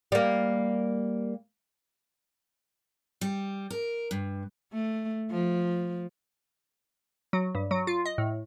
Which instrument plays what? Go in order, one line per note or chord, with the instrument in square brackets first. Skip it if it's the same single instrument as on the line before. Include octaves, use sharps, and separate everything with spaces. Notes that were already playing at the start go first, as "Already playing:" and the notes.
[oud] G3 A#3
[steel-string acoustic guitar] G3
A#4
G2
[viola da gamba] A3
F3
[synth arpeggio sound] F#3
G2
F#3
F4
D#5
A2